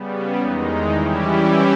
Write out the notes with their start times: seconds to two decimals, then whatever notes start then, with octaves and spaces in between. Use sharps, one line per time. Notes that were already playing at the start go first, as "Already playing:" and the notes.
Already playing: C#3 G3 B3
0.39 E2 D#3 G#3 D#4
0.92 E3 G3 C#4 E4 G4